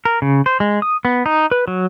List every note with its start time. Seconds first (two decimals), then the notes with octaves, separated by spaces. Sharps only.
0.05 A#4
0.22 C#3
0.46 C5
0.60 G#3
0.82 D#6
1.05 B3
1.26 D#4
1.51 B4
1.68 F#3